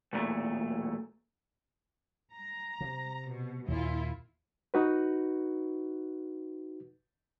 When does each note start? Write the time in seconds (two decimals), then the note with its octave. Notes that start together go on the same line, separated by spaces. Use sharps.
0.13 B1 E2 A#2 A3
2.33 A#5
2.81 C3
3.30 B2
3.68 D#2 A#2 A#3 E4 F4
4.74 D#4 F#4 B4